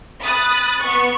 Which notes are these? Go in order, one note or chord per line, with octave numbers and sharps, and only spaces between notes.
B5 D#6 F#6 A6
B3 C#6